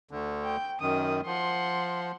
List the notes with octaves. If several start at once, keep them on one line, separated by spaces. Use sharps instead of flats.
D2 D3
G5
F#2 D#3 D#6
F3 F#5 C6